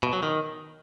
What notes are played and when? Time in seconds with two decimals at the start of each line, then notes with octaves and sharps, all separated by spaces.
0.03 B2
0.13 F#3
0.23 D#3